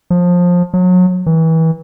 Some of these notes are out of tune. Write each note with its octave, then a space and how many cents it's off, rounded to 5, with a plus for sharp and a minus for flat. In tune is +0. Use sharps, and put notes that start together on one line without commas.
F3 +20
F#3 -30
E3 -30